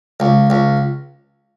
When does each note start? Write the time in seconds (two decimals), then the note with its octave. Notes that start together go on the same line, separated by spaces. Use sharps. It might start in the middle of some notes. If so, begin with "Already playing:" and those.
0.20 C#2
0.50 C#2